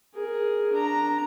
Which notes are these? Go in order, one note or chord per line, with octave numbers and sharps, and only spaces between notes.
G#4 A#4
D4 A#5